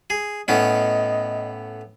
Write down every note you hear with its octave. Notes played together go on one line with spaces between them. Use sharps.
G#4
A2 B3 C#4 D#5